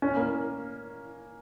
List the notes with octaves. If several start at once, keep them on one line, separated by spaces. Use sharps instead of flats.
C#4
A#3